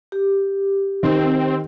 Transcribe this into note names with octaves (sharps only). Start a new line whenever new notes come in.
G4
D#3 C4